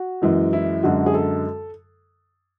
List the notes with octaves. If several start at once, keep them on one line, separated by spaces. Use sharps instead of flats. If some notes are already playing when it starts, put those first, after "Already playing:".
Already playing: F#4
F#2 E3 G#3
E4
F#2 D3 G#3 F#4
G#4
A4